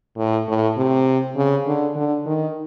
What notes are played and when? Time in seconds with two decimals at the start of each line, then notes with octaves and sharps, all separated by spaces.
0.17 A2
0.48 A2
0.77 C3
1.36 C#3
1.67 D3
1.96 D3
2.26 D#3